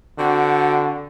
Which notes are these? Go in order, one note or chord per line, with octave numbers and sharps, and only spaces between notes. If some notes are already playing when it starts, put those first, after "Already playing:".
D3 C4 F#4